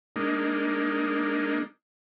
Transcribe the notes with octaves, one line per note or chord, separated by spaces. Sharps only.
G#3 A#3 D4 D#4